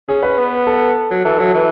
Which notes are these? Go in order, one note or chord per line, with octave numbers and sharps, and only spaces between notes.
C#4 G#4
B4
B3
A4
F#3
E3 A4
F#3
E3